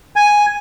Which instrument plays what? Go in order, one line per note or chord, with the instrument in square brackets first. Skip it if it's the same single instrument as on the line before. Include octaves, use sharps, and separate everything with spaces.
[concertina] G#5